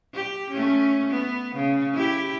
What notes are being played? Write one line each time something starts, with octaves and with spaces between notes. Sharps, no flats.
G4
A3 C#4
B3
C#3
E4 G4